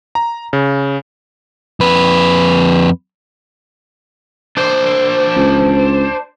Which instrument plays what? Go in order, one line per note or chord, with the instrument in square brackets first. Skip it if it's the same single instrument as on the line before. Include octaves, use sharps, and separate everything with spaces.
[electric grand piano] A#5
C#3
[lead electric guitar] F2 B4
[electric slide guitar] D4 C5
[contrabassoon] C#2